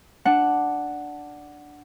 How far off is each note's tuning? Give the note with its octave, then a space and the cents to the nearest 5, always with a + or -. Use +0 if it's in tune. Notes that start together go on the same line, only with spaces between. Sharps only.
D4 +0 F#5 +0 A5 +0